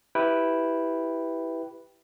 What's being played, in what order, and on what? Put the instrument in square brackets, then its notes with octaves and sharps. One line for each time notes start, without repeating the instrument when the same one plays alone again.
[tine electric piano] E4 G4 B4 G5